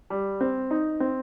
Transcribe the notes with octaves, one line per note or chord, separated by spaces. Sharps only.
G3
C4
D#4
C4